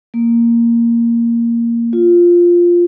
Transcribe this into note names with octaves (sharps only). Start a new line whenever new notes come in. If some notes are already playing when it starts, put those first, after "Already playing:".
A#3
F4